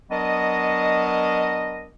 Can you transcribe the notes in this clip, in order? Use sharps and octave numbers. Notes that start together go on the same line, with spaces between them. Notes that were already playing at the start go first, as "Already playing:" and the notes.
F#3 B3 D4 A#4 D#5